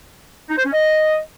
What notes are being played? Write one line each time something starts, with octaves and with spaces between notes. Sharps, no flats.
D#4
C5
C#4
D#5